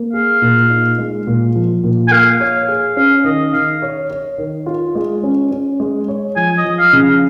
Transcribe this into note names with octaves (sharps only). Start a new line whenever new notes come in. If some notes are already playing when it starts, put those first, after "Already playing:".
Already playing: A#3
G#4 F5
A#2
D#4
G#3
A#2
F3
A#2
G#5
A#3 F5
C#5
G#4
C#4 F5
D#3 D#5
D#3 F5
C#5
C#5
D#3
F4
G#3
C#4
C#4
G#3
C#5
F3 G#5
D#5
F3
F5
C#3
F5